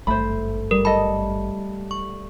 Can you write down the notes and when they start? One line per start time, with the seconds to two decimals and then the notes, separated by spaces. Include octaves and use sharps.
0.07 G#1 G2 A3 C5 B5
0.71 G3 A#4
0.85 A4 D#5 B5
1.91 C#6